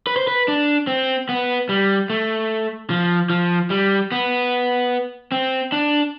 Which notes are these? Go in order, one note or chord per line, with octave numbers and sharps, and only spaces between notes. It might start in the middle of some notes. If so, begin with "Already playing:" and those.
B4
C5
B4
D4
C4
B3
G3
A3
F3
F3
G3
B3
C4
D4